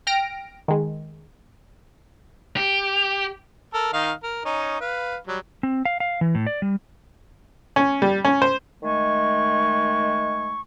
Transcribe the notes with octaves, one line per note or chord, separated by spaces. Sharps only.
G5 F6 A#6 D7
D#3 G#3
G4
A4 A#4
D#3 D#4 F5
A#4
C#4 D#4
B4 F5
F#3 G3
C4
F5
F5
E3
A2
D5
G3
C#4
G3
C#4
C5
D#3 G#3 A3 G#5 C#6